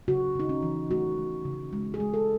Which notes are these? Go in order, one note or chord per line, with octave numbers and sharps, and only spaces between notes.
C#3 F#4
C#3 D#4
C#4
E3
A3 F#4
A3
C#3
G#3
G#4
G#3
A4